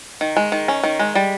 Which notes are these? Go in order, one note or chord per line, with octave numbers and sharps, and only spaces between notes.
D#3
G#3
D#3
C#4
D#3
G#3
G3